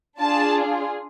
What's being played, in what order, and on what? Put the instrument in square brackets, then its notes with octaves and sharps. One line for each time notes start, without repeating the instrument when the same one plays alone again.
[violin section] D4 F4 G#4 A5